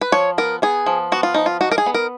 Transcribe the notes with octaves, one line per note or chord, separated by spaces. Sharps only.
B4
F3 C#5
B3 A#4
B3 G#4
F3
B3 F#4
F4
F3 D#4
F4
D#4 F#4
A#4
G#4
B3
A#4